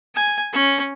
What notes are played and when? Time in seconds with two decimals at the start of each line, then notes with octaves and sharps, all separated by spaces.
0.15 G#5
0.53 C#4